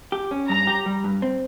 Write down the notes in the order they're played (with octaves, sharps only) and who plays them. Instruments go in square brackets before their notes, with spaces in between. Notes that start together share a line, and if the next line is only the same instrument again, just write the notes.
[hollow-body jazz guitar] G4
C#4
[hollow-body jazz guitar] G2 [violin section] A#5
[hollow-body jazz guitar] G4
G3
G2
C4